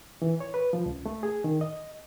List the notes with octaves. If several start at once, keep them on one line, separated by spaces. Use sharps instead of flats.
E3
C#5
B4
F3
C#2
A3
G#4
D#3
D#5